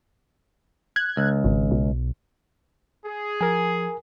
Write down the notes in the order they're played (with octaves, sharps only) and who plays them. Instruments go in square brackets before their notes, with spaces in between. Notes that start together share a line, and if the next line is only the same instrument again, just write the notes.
[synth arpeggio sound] F#6 G#6
[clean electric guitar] C#2
[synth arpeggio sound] G#1
B1
[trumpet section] G#4
[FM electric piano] F3 [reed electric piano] A#4 G#5